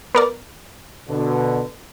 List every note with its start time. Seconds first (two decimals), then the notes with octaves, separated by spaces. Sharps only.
0.15 B3 A#4 D5
1.09 B2 D3